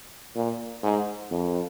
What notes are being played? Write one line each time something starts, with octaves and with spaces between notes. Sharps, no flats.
A#2
G#2
F2